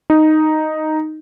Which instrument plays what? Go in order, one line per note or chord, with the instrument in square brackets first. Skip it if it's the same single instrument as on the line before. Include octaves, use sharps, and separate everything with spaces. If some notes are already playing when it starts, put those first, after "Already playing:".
[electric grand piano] D#4